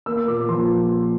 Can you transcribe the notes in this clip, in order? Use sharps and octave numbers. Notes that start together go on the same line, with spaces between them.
A#3 E6
A#2 D6
F3 C6